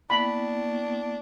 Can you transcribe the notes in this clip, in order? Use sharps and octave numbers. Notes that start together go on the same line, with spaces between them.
A#3 B3 D4 E4 G5 B5